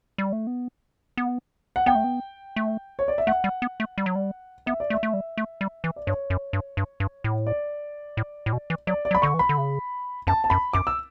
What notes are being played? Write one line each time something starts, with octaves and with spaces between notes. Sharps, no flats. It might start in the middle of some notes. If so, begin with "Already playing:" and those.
G3
A3
B3
B3
F#5
B3 G5
A3
B3
A3
C#5
D5
E5
A3 F#5
G3
B3
A3
G3
F#3
G3
B3 E5
D5
A3
E5
A3
G3
A3
G3
E3
D5
G2 C#5
F#2
G2
G2
G2
A2
D5
A2
A2
B2
E3
F#3 D5
D5
F#3
B5
D3 C#6
E3
B5
D3
C#3
F#2 A5
A5
F#2 B5
F#2 D6
E6